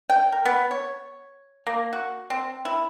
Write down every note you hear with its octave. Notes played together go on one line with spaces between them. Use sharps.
G5
A#4
B3
C#5
A#3
F#4
C4
E4